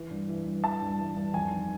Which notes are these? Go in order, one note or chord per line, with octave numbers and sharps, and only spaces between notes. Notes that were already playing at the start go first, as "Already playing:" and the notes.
Already playing: E3
G2
E3
G2
E3 A5
G2
E3
G2
F2 G#5
D#3